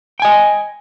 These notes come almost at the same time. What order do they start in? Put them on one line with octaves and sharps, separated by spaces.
G5 G#5 D#5